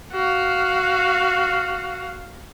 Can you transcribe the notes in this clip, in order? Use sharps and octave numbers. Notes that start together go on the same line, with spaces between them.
F#4 F5